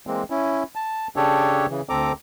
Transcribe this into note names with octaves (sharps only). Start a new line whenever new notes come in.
E3 G#3 A#3 C4
C#4 E4
A5
C#3 D4 G4 A4 C#5
C#3 E3
D2 C4 A4 A#5 D6